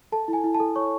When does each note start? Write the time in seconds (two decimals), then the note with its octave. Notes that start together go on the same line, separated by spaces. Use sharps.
0.12 A4 A5
0.28 E4
0.33 G#5
0.44 E4
0.55 A5
0.60 A4
0.76 C#5 C#6